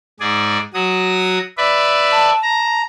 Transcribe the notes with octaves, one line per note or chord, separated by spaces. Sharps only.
G#2 G#4 D5
F#3 F#4 D#6
B4 D5 E5
A5
A#5